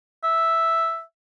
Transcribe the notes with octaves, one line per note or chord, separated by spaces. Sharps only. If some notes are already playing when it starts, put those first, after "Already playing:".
E5